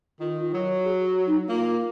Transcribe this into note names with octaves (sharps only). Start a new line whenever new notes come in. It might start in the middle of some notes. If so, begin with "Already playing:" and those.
D#3 F4
F#3
G#4
F#4
D#4
A#3 F4